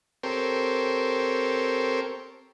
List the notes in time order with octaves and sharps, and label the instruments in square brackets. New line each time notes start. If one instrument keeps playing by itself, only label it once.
[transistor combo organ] C4 G4 A4 A#4 C5 C#5